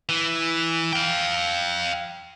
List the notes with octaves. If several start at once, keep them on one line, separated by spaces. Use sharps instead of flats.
E3
F5 G5